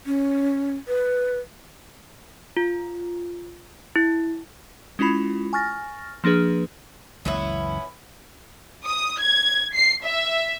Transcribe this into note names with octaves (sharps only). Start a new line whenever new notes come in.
C#4
B4
F4
E4
G#3 C#4 E4 F4 B5
G#5 C#6 F6 A6 A#6
F3 A#3 D4 G#4 B4
F#1 C#2 E3 B3 C#4 E4
D#6
G#6
C7
E5